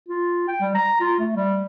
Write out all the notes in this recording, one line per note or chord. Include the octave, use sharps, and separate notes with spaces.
F4
G5
G3
A#5
F4
A3
G3